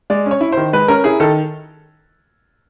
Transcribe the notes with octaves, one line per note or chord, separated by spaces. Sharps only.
G#3 D5
C#4 C#5
E4
D#3 C5
G#3 B4
C#4 A#4
E4 G#4
D#3 A4